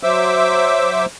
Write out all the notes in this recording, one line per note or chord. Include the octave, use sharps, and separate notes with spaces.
F#3 C5 E5 D6 E6